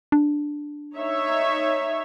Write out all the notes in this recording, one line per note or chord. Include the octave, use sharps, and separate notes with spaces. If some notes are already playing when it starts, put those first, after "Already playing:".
D4
D#4 C#5 E5